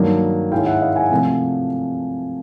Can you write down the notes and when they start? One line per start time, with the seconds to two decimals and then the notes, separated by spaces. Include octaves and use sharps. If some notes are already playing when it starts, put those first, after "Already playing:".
Already playing: G2 D#3 F#3 A#3 D#4
0.52 G#2 D#3 G#3 C#4 E4 F5 G5
0.66 E5 F#5
0.81 D#5 F5
0.96 F#5 G#5
1.11 C3 F3 A3 F#5 G#5